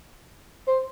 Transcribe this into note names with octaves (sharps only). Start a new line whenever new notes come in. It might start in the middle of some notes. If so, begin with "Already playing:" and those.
C5